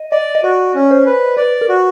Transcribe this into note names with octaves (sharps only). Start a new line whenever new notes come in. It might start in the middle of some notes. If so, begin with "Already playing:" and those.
Already playing: D#5
D5 D#5
D#5
F#4 D5
C#4
C5
B4
B4 D5
A#4
F#4